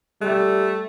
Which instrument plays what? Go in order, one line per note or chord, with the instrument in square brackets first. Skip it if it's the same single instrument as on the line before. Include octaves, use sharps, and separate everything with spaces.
[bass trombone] G3 [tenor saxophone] A3